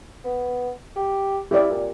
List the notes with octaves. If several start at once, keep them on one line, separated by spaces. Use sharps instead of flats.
B3
G4
E4 G4 D5
A#2